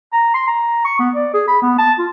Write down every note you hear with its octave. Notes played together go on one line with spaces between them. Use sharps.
A#5
C6
A#5
C#6
B3
D5
G#4
B5
B3
A5
F4